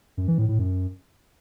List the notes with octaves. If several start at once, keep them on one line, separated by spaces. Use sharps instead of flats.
F#2
E3
A2
A2
F#2